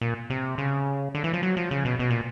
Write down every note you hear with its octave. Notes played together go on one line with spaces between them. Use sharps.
A#2
C3
C#3
D3
E3
F3
F#3
F3
C#3
B2
B2
A#2